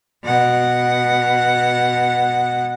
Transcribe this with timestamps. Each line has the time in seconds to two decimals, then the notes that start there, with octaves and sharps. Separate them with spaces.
0.24 B2 F#5